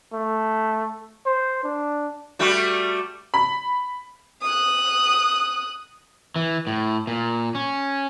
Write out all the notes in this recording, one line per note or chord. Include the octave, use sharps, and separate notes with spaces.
A3
C5
D4
G3 A3 F#4
B5
D#6 F#6
E3
A2
A#2
C#4